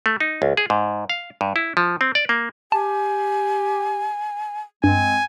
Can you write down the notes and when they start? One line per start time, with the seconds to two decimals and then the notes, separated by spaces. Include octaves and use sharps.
0.06 A3
0.20 D#4
0.42 C#2
0.57 G#4
0.70 G#2
1.10 F5
1.41 G2
1.56 E4
1.77 F3
2.01 C4
2.15 D5
2.29 A#3
2.72 G4 G#5 A5
4.84 G2 G#3 C4 G#5